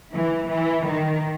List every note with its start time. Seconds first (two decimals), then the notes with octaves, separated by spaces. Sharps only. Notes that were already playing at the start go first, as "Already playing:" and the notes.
0.14 E3
0.49 E3
0.84 D#3